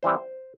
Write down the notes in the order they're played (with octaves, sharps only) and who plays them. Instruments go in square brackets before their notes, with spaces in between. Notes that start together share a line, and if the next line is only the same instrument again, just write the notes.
[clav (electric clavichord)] E3 G3 C4 C5